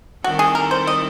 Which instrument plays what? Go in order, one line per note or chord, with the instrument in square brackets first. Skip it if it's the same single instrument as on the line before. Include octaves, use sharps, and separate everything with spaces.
[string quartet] D#3 G3 C4 E4 A4 [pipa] F#4
[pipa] G#4
A#4
C5
D#5